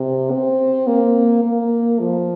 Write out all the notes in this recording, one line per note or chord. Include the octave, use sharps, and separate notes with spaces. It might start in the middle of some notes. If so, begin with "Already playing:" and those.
Already playing: C3
C4
A#3
A#3
F3